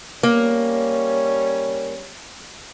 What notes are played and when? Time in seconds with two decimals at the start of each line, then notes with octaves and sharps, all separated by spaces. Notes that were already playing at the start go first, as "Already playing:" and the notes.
0.23 G3 A#3 C#4 C#5